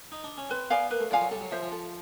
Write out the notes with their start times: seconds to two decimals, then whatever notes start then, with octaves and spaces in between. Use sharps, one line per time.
0.12 D#4
0.24 D4
0.38 C#4
0.49 C4 B4
0.70 B3 D5 F5 G#5
0.91 A#3 B4
1.00 A3
1.11 F3 D5 F5 G#5
1.21 F#3
1.31 G3 A4
1.41 F#3
1.51 F3 C5 E5
1.62 F3
1.72 A4